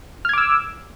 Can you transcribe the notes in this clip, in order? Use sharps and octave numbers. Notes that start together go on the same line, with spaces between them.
D6 E6 F6 G#6